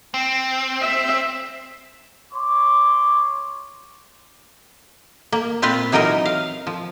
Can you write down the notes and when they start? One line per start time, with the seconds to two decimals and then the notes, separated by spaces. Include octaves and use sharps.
0.14 C4
0.81 E5
2.33 C#5 C6 D6
5.32 A#3
5.62 A#2 C4 F4 B4 F5
5.92 E3 F#3 D#4 A#4 D#5
6.26 F5
6.67 F3